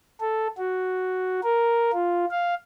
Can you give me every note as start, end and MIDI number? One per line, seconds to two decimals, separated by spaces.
0.20 0.47 69
0.58 1.40 66
1.43 1.91 70
1.93 2.25 65
2.31 2.54 77